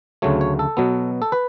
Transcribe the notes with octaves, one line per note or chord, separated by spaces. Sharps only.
D2 C#3 F#3 A3 C#5
C#5
A4
B2 F#3 B3
A4
B4